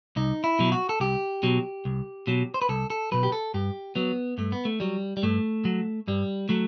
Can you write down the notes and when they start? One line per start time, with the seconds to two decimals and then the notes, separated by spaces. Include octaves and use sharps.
0.16 C2 D#4
0.44 E4
0.59 B2 F#3
0.72 F#4
0.89 A4
1.00 C2 G4
1.43 B2 F#3
1.85 C2
2.27 B2 F#3
2.54 C5
2.62 B4
2.69 C2 A4
2.90 A4
3.12 B2 F#3 B4
3.23 G4
3.32 A4
3.54 G2 G4
3.95 F#3 B3
4.38 G2 A3
4.52 B3
4.65 A3
4.80 F#3 G3
5.17 G3
5.23 G2 A3
5.65 F#3
6.08 G2 G3
6.49 F#3 A3